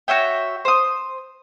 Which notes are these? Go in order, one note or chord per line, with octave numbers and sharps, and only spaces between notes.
F#4 C#5 E5 G5
C5 D#6